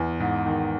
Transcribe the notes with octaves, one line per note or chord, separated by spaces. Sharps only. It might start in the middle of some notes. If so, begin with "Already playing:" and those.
Already playing: E2 G#5
G#2
D#3